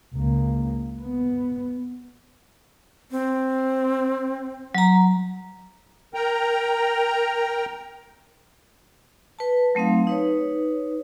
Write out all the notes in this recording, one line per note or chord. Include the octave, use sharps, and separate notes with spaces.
C#2 A#3
B3
C4
F#3 A#5
A#4 G5 A#5
B4 A5
F#3 A3 C4 D#4 F5
D#4 B4 C#5